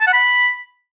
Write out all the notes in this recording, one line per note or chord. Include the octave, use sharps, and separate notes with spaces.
A5
F#5
B5